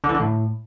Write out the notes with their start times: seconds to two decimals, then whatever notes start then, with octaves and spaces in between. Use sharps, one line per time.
0.04 D3
0.09 E3
0.15 D3
0.20 A2